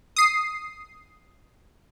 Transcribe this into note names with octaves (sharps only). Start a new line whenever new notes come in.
D#6 C7